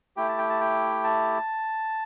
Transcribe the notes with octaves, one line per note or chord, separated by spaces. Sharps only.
A3 E4 G4 G5
A5
G5
A5
G5
A5